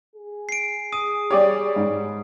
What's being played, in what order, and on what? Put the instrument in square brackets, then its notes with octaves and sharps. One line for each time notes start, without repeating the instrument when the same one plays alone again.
[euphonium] G#4
[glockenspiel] C7 D7
[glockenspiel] D#6 [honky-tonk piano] D#7
[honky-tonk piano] G3 C#5 [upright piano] G4 D5
[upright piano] G#2